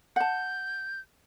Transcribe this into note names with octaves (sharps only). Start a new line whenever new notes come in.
F#5 A5 G6